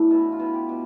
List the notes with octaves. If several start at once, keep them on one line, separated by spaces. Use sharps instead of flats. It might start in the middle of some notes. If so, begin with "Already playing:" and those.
Already playing: A2 E3 B3 D4
B2 E4
F4
B2
G4
B2